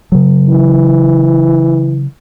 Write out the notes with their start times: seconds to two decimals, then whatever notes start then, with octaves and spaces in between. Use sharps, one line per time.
0.12 C#3 F#3
0.49 E3